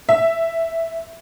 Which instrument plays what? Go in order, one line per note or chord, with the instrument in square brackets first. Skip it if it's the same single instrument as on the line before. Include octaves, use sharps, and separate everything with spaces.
[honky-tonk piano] E5